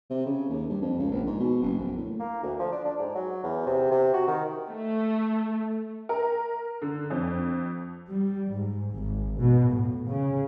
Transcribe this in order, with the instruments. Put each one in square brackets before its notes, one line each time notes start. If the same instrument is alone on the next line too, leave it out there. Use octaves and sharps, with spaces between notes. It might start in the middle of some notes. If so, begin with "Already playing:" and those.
[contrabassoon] C3
C#3
D#2
G2
F2
C#2
A#1
G#2
B2
F#1
A#1
A2
[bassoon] A#3
D2
F3
D4
D4
G#2
F#3
E2
C3
C3
F#4
D#3
[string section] A3
[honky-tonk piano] A#4
D3
F2
[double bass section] G3
G#2
G#1
B2
A2
C#3